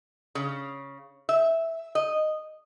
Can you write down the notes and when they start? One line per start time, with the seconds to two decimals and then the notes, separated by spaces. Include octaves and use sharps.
0.35 C#3
1.29 E5
1.95 D#5